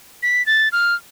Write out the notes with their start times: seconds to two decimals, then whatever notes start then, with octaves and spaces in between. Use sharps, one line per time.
0.23 B6
0.46 A6
0.72 F6